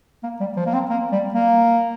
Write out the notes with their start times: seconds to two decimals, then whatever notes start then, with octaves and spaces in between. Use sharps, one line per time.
0.23 A#3
0.40 G3
0.57 F3
0.66 A#3
0.73 C4
0.90 A#3
1.12 G3
1.34 A#3